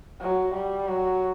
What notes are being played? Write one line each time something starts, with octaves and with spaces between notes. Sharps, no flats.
F#3
G3
F#3